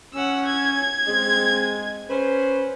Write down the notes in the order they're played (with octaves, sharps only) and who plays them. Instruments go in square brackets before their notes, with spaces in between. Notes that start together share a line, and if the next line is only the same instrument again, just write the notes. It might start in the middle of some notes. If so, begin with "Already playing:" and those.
[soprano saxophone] C#4 [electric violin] F#5 E6
[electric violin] G#6
[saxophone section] G#3 [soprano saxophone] C4
[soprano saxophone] C#4 [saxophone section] B4 C5